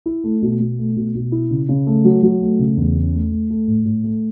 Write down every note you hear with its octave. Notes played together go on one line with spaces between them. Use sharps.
E4
A3
B2
B2
A3
B2
B2
E4
C#3
C#3
A3
F#3
F#3
A3
C#3
E2
C#4
A3
A3
A3
A2
A2
A3